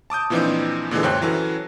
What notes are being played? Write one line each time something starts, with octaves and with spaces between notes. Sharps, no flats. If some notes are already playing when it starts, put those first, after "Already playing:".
A5 D6 D#6 G6
A#2 E3 F3 C4 D4 D#4
A#2 D3 E3 G#3
F#2 C5 C#5 G5 F#6
E3 F#3 C#4 A4